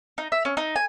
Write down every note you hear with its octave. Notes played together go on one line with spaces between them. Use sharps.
D#4
E5
C#4
D#4
G#5